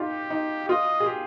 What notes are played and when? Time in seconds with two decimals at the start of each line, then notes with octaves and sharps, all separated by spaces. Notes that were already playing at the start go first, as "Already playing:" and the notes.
Already playing: D#4 F4 G4
0.30 D#4
0.68 F4 D#5
1.00 G#4
1.06 G4